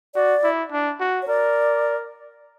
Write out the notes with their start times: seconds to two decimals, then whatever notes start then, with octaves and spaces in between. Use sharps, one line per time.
0.15 F#4 D5
0.44 E4
0.72 D4
1.00 F#4
1.22 C#5
1.28 A#4 D5